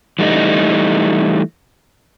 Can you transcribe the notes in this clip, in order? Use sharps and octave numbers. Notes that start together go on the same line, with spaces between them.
E3 G3 A3 D#4